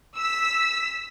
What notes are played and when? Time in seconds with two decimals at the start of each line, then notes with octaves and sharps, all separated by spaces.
0.16 E6 B6